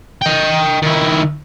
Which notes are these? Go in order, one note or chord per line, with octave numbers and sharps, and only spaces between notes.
D#5 G5
D#3 E4